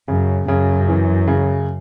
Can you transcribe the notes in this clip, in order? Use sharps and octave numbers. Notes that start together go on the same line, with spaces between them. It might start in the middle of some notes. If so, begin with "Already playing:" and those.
F#2 C#3
F#2 C#3
E3
C#3